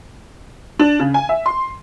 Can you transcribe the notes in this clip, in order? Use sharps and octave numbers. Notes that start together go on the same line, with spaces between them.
D4
C#3
G#5
E5
C6